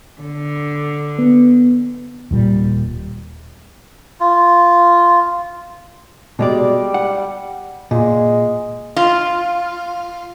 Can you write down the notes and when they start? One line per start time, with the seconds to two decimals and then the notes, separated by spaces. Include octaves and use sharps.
0.21 D3
1.19 B3
2.31 D#1 A#2 G3
4.20 F4
6.39 B2 G3 G#3 D5
6.94 F#5
7.91 A#2 G#3
8.96 F4